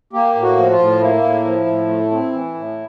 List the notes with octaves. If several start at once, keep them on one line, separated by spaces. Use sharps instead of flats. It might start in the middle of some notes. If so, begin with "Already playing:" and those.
A#3 G4
A2
F#4
F3
F4
A2
A#3 E4
A2
F3
A2
A3
C4
E3
A2